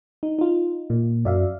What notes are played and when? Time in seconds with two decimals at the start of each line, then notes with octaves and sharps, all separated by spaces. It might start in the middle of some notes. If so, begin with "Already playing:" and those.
0.23 D#4
0.39 D#4 F4
0.90 A#2
1.25 F#2 D5 E5 F5